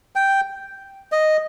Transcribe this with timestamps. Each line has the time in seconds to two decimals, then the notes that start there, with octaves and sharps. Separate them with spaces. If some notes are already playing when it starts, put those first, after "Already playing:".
0.16 G5
1.12 D#5